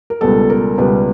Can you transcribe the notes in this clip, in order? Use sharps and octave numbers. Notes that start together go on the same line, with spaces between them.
A#4
C#2 B2 G3 B3 A4
A#4
C#2 B2 G3 B3 B4